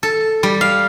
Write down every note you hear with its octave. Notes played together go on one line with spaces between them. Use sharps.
A4
G3
F5